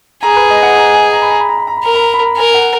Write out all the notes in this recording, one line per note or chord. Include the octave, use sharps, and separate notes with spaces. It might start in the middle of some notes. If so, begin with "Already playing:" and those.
G#4 A#5
B4
D#5
F#5
A#5
G#5
A#5
B5
A#5
B5
A#5
B5
A#5
B5
A#4 A#5
B5
A#5
B5
A#5
A#4 G#5
F#5